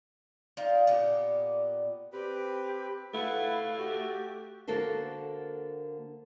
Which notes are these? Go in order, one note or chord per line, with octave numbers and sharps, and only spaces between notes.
D#4 F4 D5 F5
A#2 B3 G4
C4 G4 B4
A3 E4 B4 F5 F#5
F#4 G4
D3 A#3 F#4 A4 A#4 C5